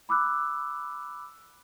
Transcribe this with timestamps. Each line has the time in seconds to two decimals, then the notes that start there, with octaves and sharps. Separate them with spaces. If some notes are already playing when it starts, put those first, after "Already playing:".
0.09 B5 D6 E6 F#6